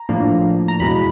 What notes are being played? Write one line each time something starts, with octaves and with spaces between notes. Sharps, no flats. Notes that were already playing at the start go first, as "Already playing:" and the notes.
Already playing: A#5
A2 F3 A#3 D4
A#5
E2 B2 G#3 B5